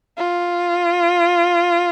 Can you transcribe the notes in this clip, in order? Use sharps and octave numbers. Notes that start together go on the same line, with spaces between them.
F4